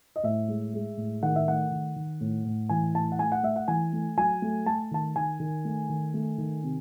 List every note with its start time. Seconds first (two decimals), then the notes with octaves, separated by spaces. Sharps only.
0.16 D#5
0.23 A2 E5
0.48 G#3
0.74 G#3
0.97 A2
1.23 D#3 F#5
1.36 E5
1.48 A3 F#5
1.71 D#3
1.96 D#3
2.21 A2
2.45 A2
2.69 E3 G#5
2.95 A2 A5
3.12 F#5
3.19 A3 G#5
3.32 F#5
3.43 A3 E5
3.56 F#5
3.68 E3 G#5
3.93 A3
4.17 F#3 G#5
4.42 A3
4.66 A3 A5
4.91 D#3 A5
5.16 D#3 G#5
5.40 D#3
5.65 A3
5.89 D#3
6.14 A3
6.38 D#3
6.63 C3